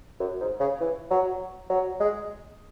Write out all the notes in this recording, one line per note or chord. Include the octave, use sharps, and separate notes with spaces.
F#2
G#2
C#3
E3
F#3
F#3
G#3